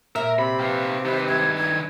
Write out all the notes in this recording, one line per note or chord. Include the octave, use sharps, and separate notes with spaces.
A#2 A#4 E5
C3 B5
G4 B4 F5
D#3 B4 C5
G2 G#6
G#6